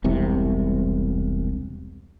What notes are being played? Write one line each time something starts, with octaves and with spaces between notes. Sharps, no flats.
E1 C2 C3